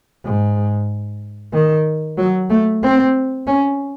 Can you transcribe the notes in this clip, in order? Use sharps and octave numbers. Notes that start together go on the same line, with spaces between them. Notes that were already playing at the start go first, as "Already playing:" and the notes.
G#2
D#3
F#3
A3
C4
C#4